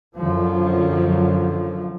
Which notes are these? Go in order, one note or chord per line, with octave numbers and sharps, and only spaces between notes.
F#2 D3 F3